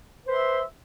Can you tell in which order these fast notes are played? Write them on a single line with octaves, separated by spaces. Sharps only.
B4 C5 C6 E5